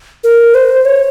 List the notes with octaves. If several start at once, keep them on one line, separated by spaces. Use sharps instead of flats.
A#4
C5
C#5